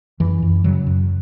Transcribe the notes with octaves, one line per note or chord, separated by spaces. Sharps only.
F#2 E3
F#2
C#3 F#3
F#2